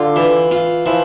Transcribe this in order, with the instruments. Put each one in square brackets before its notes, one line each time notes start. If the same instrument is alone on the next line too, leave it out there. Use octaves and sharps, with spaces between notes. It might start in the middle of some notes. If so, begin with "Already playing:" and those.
Already playing: [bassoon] D3 [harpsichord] F4
[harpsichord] E3
F4
[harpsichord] E3 [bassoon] F3